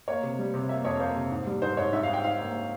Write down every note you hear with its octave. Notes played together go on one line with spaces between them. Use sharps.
A#3 C#5
C3
G3
C3
A#3 E5
F2 C#5
A#3 C5
C3
G#2
G3
G#2 C5
G#2 C#5
G#2 E5
G#2 F5
G5
G#2 F5
A#3